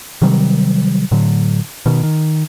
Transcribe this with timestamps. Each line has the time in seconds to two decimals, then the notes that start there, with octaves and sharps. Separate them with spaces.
0.22 C3 D#3 F#3 G3
1.11 A2 D3 F#3
1.86 B2 D#3
2.03 D#3